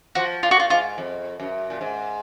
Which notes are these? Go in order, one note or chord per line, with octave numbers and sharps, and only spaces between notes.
F3 F#4
A#2 F4
F#4
F4
G#2 F4
F2
F#2
A#2
G#2